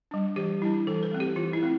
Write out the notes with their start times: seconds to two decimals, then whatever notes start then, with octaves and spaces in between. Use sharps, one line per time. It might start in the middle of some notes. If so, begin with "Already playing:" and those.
0.11 G3 D4
0.36 E3 G4
0.62 G3 E4
0.65 D4
0.87 E3 A4
1.03 B4
1.12 A3 C4
1.20 G4
1.36 E3 F4
1.53 E4
1.62 A3 C4